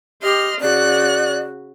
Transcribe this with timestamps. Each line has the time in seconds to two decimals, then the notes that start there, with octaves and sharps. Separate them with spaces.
0.23 G4 D#5 C6 F6
0.61 C#3 F#4 D5 F#6